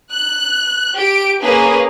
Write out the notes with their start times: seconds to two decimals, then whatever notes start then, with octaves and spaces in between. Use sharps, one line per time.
0.11 F#6
0.95 G4 D7
1.42 A#3 C#4 G#4 B4